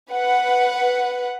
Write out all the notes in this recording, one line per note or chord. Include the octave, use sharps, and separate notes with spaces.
B4 F#5